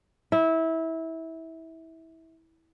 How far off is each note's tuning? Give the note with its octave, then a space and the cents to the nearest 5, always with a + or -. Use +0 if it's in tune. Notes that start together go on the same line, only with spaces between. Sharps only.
E4 -20